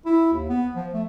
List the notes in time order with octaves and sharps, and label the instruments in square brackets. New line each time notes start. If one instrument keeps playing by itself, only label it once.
[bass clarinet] E4
D#2
B3
F3
A3